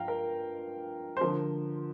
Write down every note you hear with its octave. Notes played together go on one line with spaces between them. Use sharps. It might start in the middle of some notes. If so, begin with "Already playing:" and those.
Already playing: G2 F3 F5 G5 A#5
A#4
C5
D3 F3 A#4